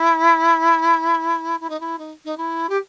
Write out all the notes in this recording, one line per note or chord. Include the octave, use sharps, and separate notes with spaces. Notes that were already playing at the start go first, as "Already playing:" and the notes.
Already playing: E4
E4
D#4
E4
D#4
D#4
E4
G4